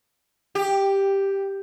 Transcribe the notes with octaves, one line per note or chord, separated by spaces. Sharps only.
G4